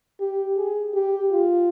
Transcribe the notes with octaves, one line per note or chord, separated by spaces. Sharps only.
G4
G#4
G4
F4